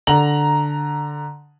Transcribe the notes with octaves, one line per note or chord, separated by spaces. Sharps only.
D3 A#5 F#7